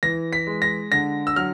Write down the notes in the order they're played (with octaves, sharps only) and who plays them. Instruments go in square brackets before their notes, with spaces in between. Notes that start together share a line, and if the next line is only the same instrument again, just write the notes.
[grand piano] E3 A#6
B6
G#3
A#6
D3 A#6
E6
F#3 F6